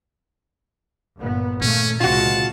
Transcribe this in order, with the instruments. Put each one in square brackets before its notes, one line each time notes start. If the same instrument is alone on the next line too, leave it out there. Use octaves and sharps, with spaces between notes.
[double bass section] G1 A#2 B3
[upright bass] A#2 D#3 [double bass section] A3 A#3 [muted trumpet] C#4
[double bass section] C#2 C3 [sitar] F4 F#4 [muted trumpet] A5